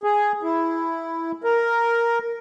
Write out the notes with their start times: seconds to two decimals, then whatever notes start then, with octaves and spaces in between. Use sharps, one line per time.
0.03 G#4
0.43 E4
1.44 A#4